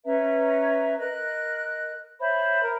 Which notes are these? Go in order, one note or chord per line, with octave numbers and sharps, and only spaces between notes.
C#4 B4 E5 A#5
A#4 D#5 F#6
C5 C#5 E5 B5
A#4